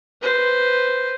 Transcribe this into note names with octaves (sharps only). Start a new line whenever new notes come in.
B4 C5